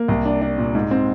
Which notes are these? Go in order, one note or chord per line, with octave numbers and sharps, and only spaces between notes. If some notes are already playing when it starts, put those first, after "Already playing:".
Already playing: A#3
C2
D4
D4
A#2
G#2
C4